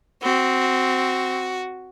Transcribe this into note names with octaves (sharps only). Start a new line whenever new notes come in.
C4 F#4